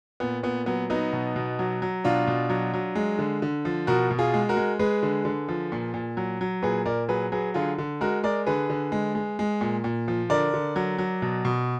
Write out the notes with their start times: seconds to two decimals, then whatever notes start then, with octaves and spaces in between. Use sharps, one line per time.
0.20 A#2 B3
0.43 A#2 B3
0.66 F#3 B3
0.90 F#3 B3 D#4
1.13 B2
1.36 B2
1.59 F#3
1.82 F#3
2.04 B2 D4 F4
2.27 B2
2.50 F#3
2.74 F#3
2.95 G#3
3.19 D3
3.42 D3
3.65 F3
3.87 B2 F#4 A#4
4.11 B2
4.19 F4 G#4
4.34 G#3
4.49 F#4 A#4
4.57 G#3
4.79 G#3 G#4 B4
5.03 D3
5.25 D3
5.49 F3
5.72 A#2
5.94 A#2
6.17 F#3
6.41 F#3
6.63 A#2 G#4 B4
6.85 A#2 A#4 D5
7.09 F#3 G#4 B4
7.32 F#3 G#4 B4
7.54 D3 F4 G#4
7.78 D3
8.01 G#3 F#4 A#4
8.23 G#3 A#4 D5
8.47 D3 G#4 B4
8.70 D3
8.92 G#3
9.15 G#3
9.39 G#3
9.61 A#2
9.84 A#2
10.08 F3
10.30 D3 A#4 D5
10.54 D3
10.76 F#3
10.98 F#3
11.22 B2
11.45 B2